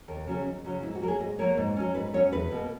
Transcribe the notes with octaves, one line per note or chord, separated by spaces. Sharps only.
D#2 A#4
C#3 F#3 C#4
D#2
C#3 F#3 C#4
G#2 E4
F#4
F#3 A#3 A#4
G#4
G#2 D#5
F#3 A#3 C#5
G#2
F#3 C#4
G#2 B4
F#3 C#4 C#5
E2 B4
B2 A#3